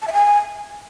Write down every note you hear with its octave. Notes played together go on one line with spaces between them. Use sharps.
A5
E5
G#5